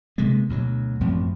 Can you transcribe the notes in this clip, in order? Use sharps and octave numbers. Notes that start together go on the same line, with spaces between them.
C3 G#3 A#3 B3
D2 B2 F#3
A1 F#2 F3 C4